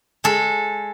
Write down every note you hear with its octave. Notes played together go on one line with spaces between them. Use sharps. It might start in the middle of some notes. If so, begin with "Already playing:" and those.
G#3 A4